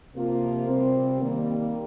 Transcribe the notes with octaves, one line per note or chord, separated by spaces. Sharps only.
C3 F3 A#3 F4
C3 G3 C4
D#3 G3 A#3